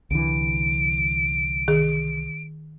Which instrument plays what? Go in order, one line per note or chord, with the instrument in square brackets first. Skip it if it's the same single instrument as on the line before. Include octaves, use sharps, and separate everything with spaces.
[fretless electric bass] C2 D3 E3 [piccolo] D7
[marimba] D#3 G#4